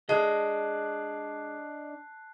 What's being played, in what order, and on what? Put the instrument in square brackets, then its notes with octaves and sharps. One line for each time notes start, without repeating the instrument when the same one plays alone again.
[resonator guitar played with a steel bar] G#3 [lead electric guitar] D4 D#5 [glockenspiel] A5 [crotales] F#6 C7